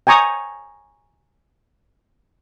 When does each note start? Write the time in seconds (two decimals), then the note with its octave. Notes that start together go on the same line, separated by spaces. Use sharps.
0.07 G5 G#5 A#5 C#6 D#6